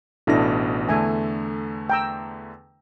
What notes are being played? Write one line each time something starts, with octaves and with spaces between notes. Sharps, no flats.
A1 B2 D4 E4 A4 A#6
E2 D3 A3 A4 E5 G#5
G5 A#5 E6